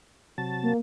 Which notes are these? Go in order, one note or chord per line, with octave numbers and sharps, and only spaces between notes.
C3 F#3 A5
A#3